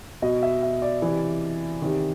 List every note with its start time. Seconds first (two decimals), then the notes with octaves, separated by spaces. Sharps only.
0.22 B2 D#5
0.43 E5
0.63 E5
0.82 D5
1.02 C3 E3
1.82 C3 D#3